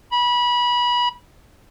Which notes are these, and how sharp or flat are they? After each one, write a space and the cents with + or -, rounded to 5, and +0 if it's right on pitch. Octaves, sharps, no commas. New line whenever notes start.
B5 -25